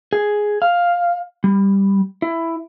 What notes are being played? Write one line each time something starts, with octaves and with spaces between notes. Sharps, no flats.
G#4
F5
G3
E4